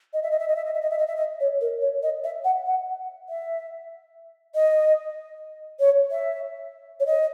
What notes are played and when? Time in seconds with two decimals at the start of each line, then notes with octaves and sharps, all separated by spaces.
0.14 D#5
0.23 E5
0.31 D#5
0.39 E5
0.48 D#5
0.56 E5
0.65 D#5
0.74 E5
0.81 D#5
0.90 E5
0.98 D#5
1.07 E5
1.16 D#5
1.40 C#5
1.61 A#4
1.82 C#5
2.03 D#5
2.24 E5
2.44 F#5
2.66 F#5
3.29 E5
4.55 D#5
5.80 C#5
6.11 E5
7.00 C#5
7.06 D#5